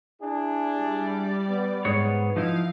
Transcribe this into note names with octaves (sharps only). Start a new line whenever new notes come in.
D4 E4 G#4
G3 D5
B3
G#2 G#4 C#5
F3 D#4 E4 F5